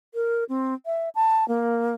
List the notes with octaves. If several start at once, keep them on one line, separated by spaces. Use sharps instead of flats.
A#4
C4
E5
A5
A#3